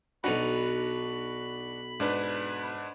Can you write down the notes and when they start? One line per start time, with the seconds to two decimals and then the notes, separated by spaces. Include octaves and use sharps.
0.24 B1 D4 D#4 F#4 F#5 B5
2.00 G#2 D4 B4